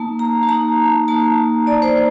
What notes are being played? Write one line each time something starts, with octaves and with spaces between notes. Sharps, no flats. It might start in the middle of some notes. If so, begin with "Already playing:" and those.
Already playing: A#3 D#4 A5
A#5
A5
A#3 D#4 A#5
A#3 D#4 A5
A#3 D#4 D5
C5